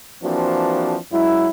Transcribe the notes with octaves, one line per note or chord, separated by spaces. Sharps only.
E3 F3 A#3 C4 D4 F#4
F#2 F#3 G#3 E4